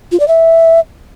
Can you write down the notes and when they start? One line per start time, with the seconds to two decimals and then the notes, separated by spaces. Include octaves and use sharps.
0.12 F4
0.20 D5
0.28 E5